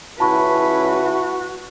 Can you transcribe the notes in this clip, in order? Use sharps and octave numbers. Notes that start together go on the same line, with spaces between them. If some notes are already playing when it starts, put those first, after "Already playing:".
C#2 C#4 E4 F#4 B4 A5 B5 C#6